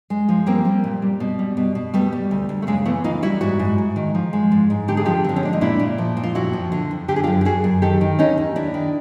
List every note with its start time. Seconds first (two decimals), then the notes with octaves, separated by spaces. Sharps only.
0.10 G#3
0.29 F3
0.46 G3 A#3 C4
0.65 G3
0.84 A#2
1.02 G3
1.20 B2
1.39 G3
1.57 B2
1.75 B2
1.94 G3 A3 B3
2.13 G3
2.31 D2
2.49 D2
2.62 A3
2.67 C#3 G#3 A#3
2.85 E3 A3 B3
3.04 D2 D#4 F4
3.22 G3 E4 F#4
3.41 G#2 E4 F#4
3.59 G#2
3.78 G#2
3.96 D#3
4.15 F3
4.33 G#3
4.52 G#2
4.70 G#2
4.88 D3 G4
4.97 G#4
5.05 F3 F4 G4
5.24 D3 C4
5.36 C#4
5.43 G#3 D4
5.53 D#4
5.61 A#2 D4 E4
5.80 A#2
5.98 F3
6.17 A#2
6.23 F4
6.35 F2 E4 F#4
6.53 F3
6.72 D3
6.91 F2
7.08 D3 G4
7.16 G#4
7.24 F4 G4
7.27 F#2
7.41 G4
7.45 F#2 F#4 G#4
7.64 F#2
7.82 D#3 G4 A4
8.01 D#3
8.19 D#2 C#4 D#4
8.38 D#2
8.56 D#2 D4 E4
8.74 D#3